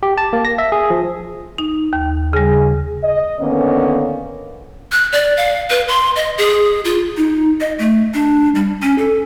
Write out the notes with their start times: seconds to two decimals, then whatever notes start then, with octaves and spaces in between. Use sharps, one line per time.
0.03 G4
0.18 A5
0.33 A#3
0.45 A#6
0.58 E5
0.72 G#4
0.90 F3
1.58 D#4
1.93 D#2
2.33 C#3 G3 G#4
3.03 D#5
3.40 D3 D#3 A#3 B3 C#4
4.92 F#6
5.12 D5
5.37 F5
5.70 B4
5.88 C6
6.16 D#5
6.38 G#4
6.85 F4
7.17 D#4
7.60 D#5
7.79 A3
8.14 D4
8.55 G3
8.82 C#4
8.98 A4